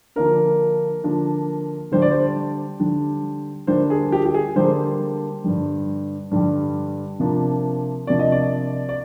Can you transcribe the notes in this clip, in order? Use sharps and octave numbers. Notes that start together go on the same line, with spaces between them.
D3 F3 A#3 D4 A#4
D3 F3 A#3 D4
D3 G3 D4 C5
D5
C5
D3 G3 D4
D3 G3 A#3 D4 C5
G#4
G4
G4
G#4
D3 G3 A#3 D4 C5
G2 D3 G3
G2 D3 G3
C3 F3 A#3 D4
C3 F3 A#3 D4 D5
D#5
D5
D5